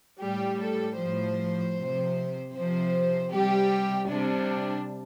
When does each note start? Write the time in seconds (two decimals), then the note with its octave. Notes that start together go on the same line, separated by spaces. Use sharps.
0.21 A2 G3 G4
0.60 A4
0.98 A2 F3 C5
1.76 C3 F3
2.53 C3 F3 C5
3.31 C3 G3 G4
4.08 C3 G3 D4